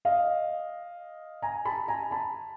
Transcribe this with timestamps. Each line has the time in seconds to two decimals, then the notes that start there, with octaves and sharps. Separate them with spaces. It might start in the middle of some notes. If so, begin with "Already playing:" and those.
0.05 D#5 F5
1.42 G#5 A#5
1.65 A5 B5
1.88 G#5 A#5
2.11 A5 B5